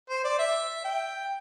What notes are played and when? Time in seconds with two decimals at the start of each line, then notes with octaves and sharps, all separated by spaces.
0.09 C5
0.24 D5
0.39 E5
0.84 G5